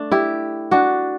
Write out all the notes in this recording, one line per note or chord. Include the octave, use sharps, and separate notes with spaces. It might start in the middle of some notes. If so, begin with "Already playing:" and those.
Already playing: A3 D4
E4 G4
D4 F#4